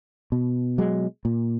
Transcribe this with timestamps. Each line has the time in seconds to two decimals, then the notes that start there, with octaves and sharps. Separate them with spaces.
0.32 B2
0.78 F#3 G#3
1.25 A#2